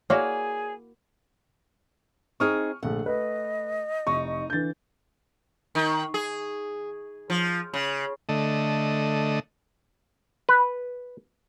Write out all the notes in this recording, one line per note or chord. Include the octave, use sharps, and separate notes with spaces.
A#3 E4 F#4 G#4 C#5 D5
C4 D#4 G#4 C#6 D#6 F6
A#1 D3 A3 F#5
A3 B4 D#5
F1 D#4 C#6
D3 E3 G6 A6
D#3
G#4
F3
C#3
D3 A3 D#5
B4